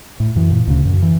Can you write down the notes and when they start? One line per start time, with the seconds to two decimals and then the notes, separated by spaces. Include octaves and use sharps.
0.20 A2
0.36 F#2 E3
0.51 A#2
0.67 D2 C#3
0.85 F#2
1.02 E3